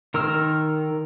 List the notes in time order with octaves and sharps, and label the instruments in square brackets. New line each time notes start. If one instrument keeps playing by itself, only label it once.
[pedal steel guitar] D#3 A#4 C6 E6 F6